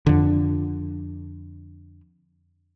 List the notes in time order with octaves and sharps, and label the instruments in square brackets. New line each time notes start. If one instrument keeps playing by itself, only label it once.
[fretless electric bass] F2 D3